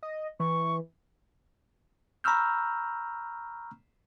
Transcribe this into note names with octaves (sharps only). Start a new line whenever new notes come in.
D#5
E3 C#6
A#5 B5 C#6 E6 F6 G6